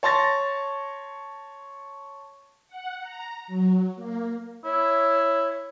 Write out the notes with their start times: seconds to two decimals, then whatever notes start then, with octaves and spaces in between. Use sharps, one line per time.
0.03 C#5 A5 C6 C#6 A6 A#6
2.68 F#5
3.01 A#5
3.47 F#3
3.96 A#3
4.65 E4 C#5